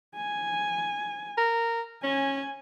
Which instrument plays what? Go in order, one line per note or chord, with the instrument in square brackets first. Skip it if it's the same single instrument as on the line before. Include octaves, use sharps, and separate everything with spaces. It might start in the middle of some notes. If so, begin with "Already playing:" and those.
[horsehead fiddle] G#5
[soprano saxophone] A#4
[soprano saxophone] C#4 [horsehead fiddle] G#5